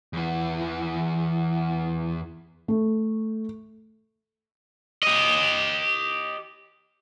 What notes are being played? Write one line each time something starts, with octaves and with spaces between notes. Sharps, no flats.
E2 E3
A3
G4 D#5